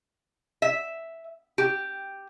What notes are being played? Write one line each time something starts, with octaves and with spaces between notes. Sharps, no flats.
E5
G4